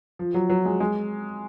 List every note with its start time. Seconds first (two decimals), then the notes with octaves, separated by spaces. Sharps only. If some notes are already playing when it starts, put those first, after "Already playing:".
0.19 F3
0.34 F#3
0.49 F#3
0.65 G#3
0.80 G#3